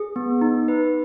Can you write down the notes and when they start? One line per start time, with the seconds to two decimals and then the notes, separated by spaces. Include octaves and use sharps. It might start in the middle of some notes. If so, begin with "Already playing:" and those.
Already playing: G#4
0.16 B3
0.41 D#4
0.68 B4